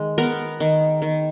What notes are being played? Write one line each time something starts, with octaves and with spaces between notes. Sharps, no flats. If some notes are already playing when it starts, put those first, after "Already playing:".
Already playing: D#3 G#3
B3 A#4
D#3
D#3